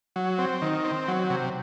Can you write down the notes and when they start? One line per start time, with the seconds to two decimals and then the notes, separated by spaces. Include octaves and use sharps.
0.16 F#3
0.39 C4
0.62 D#3
0.84 C4
1.08 F#3
1.30 C3